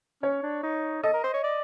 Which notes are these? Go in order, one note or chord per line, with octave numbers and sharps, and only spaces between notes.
C#4 C#5
D4
D#4
A4 D#5
A#4
C5
C#5
D5